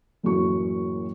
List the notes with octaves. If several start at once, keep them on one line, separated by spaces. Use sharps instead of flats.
F#1 F#2 A2 E3 F#4 C#6